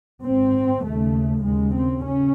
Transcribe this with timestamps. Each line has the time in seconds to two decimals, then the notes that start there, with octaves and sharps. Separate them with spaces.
0.23 G#1 G#2 C4
0.83 D#2 C#3 A3
1.44 D#2 C#3 G#3
1.74 C4
2.04 C#3 C#4